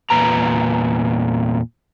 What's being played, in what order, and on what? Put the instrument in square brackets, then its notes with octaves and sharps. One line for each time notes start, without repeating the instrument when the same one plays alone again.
[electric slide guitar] E2 A#2 B4 A#5